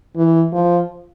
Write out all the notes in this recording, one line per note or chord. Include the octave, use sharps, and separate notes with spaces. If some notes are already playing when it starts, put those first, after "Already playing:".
E3
F3